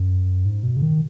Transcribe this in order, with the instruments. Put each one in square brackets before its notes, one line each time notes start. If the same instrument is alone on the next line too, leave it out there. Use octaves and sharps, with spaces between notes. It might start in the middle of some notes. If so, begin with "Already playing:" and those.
Already playing: [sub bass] F#2
G#2
B2
C#3
D#3